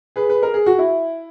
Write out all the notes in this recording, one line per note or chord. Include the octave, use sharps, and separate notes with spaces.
G#4 B4
B4
A#4
G#4
F#4
E4